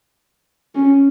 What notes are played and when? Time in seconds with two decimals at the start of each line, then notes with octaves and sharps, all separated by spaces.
0.75 C#4